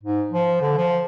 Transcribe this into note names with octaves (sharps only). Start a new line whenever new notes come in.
G#2
F3
D3
F3